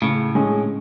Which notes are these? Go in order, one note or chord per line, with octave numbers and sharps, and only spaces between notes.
A2 C#3
G#3 C#4 G#4